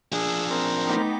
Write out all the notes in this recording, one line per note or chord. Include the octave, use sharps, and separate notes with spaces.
F3 D4 G#4 E6
C4 A#4
A3 B3 D#4 G5 D6